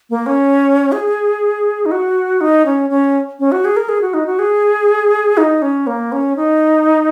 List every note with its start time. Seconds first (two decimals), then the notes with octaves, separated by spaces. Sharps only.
0.10 A#3
0.26 C#4
0.92 G#4
1.86 D#4
1.91 F#4
2.41 D#4
2.66 C#4
2.90 C#4
3.40 C#4
3.52 F#4
3.65 G#4
3.77 A#4
3.89 G#4
4.02 F#4
4.14 D#4
4.26 F#4
4.39 G#4
5.37 D#4
5.62 C#4
5.87 A#3
6.12 C#4
6.36 D#4